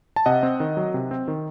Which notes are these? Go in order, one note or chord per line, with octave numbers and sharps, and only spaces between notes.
A5
C3 D#5 F#5
C4
D#3
F#3
C3
C4
D#3